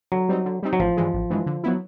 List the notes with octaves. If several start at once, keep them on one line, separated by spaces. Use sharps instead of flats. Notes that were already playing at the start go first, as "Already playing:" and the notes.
D3 F#3
G3 C4 D#4
D3
G3 C4 D#4
F#3
A1 F3
G2 E3 G#3
A1
G2 E3 G#3
D3
F#3 B3 E4